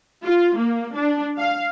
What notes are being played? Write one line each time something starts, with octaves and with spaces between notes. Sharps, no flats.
F4
A#3
D4
F5